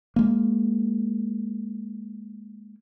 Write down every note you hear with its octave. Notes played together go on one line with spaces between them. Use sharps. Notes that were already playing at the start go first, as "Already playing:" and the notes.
G#3 A#3